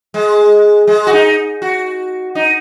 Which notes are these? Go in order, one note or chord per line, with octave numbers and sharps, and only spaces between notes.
G#3
G#3
F#4
D#4
F#4
D#4